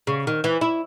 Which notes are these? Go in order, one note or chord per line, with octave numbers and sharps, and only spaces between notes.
C#3
D#3
E3
E4